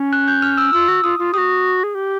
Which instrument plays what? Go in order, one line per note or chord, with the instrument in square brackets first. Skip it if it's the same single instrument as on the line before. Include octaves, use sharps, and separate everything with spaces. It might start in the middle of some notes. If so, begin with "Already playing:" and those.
Already playing: [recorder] C#4
[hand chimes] F#6
G6
F6
E6
[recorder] F4 [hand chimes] E6
[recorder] F#4
[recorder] F4 [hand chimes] D#6
[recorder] F4
[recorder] F#4 G4 [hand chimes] D#6
[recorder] G#4
G4